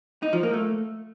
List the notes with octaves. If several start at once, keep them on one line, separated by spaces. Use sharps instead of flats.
D#4
F3
A#3
A3